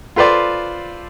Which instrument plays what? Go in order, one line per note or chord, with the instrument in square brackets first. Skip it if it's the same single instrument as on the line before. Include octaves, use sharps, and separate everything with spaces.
[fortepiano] F4 A4 B4 C5 D5